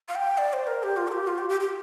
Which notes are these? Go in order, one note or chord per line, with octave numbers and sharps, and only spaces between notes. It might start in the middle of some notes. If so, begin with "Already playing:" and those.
F5
G5
D5
C5
A#4
G4
F4
A#4
G4
F4
G4
G4
G4